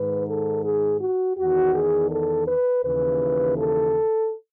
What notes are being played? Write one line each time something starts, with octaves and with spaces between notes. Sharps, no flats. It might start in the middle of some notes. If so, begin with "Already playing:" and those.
Already playing: G#2 D#3 B4
A4
G#4
F#4
E2 D#3 F#4
G#4
A4
B4
D#2 C#3 E3 B4
A4